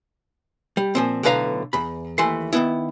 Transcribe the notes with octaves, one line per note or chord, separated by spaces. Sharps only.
G3
A#2 F3 C4
B1 A2 D3 B4 F5 A#5
E2 B5
D#2 E3 A3 C6
D#3 B3 E4